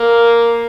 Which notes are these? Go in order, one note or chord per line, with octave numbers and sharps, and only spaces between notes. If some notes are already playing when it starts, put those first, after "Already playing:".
Already playing: A#3